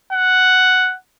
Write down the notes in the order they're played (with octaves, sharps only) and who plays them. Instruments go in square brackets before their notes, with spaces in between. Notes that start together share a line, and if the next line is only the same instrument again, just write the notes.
[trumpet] F#5